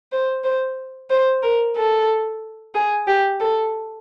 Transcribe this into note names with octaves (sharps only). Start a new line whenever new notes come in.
C5
C5
C5
A#4
A4
G#4
G4
A4